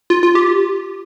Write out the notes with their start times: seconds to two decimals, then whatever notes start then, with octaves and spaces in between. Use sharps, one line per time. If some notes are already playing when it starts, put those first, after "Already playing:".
0.10 F4
0.23 F4
0.35 G4